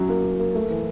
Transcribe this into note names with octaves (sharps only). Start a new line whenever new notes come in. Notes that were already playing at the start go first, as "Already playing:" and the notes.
Already playing: F#2 F#3
A#3
F#3
A#3
A3
E3